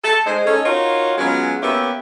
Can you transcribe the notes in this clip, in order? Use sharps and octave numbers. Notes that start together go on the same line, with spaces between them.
A4
G#3 C5 D#5
C#4 D#4 A4
D#4 F4 F#4 A#4 C#5
F#3 G#3 B3 C#4 F4 F#4
A#3 B3 C#4 G4 E5